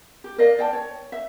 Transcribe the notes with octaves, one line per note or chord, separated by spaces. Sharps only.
G4
A#4 D5 D#5 F5
D5 G5 A5
C#5
E5